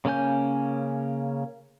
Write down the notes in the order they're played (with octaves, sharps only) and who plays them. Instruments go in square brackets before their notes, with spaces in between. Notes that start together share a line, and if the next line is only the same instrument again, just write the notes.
[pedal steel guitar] C#3 A#3 C#4 G#5 G6